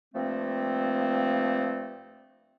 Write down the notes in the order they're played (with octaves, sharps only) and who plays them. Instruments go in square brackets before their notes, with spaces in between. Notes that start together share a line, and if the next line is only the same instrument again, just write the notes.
[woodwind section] G2 F3 A3 A#3 C4